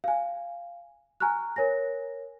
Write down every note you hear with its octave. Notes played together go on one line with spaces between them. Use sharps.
F5 G#5
G#5 A#5 C#6 F6 F#6
A#4 C#5 G#5 A#6